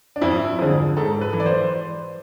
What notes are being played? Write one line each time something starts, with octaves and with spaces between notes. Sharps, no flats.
D4
F2 E4
D3 F3 G#4
G#2 A4
B4
E3
D5
C5